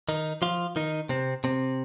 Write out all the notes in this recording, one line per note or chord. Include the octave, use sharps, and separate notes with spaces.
D#3 D#4
F3 F4
D#3 D#4
C3 C4
C3 C4